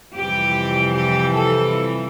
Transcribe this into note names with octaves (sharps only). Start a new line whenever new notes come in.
F2 C3 E3 G3 G4
G4
A4